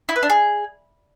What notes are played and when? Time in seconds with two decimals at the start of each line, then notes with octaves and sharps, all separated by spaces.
0.09 E4
0.16 B4
0.23 D4
0.30 G#4